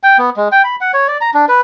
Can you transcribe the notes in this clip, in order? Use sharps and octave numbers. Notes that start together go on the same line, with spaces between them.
G5
B3
G#3
G5
B5
F#5
C#5
D5
A#5
D4
B4